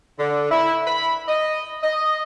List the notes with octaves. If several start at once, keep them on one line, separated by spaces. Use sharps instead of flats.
D3
E4
B5
D#5
D#5